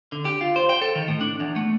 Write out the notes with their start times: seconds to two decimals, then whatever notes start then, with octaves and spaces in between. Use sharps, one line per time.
0.12 D3
0.25 G4
0.41 F4
0.56 C5
0.69 G5
0.82 A4
0.95 D#3
1.08 A2
1.21 D4
1.40 E2
1.56 A3